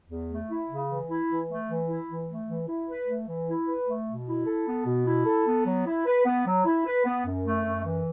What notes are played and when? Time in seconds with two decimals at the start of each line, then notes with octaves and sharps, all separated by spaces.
0.09 E2
0.30 A3
0.49 E4
0.69 C#3
0.89 E3
1.09 E4
1.29 E3
1.48 A3
1.69 E3
1.88 E4
2.08 E3
2.27 A3
2.47 E3
2.68 E4
2.88 B4
3.07 A3
3.28 E3
3.48 E4
3.67 B4
3.87 A3
4.07 B2
4.27 E4
4.46 A4
4.67 B3
4.86 B2
5.06 E4
5.26 A4
5.46 B3
5.66 F#3
5.86 E4
6.06 B4
6.26 B3
6.46 F#3
6.65 E4
6.86 B4
7.05 B3
7.25 F#2
7.45 A3
7.64 F#2
7.85 E3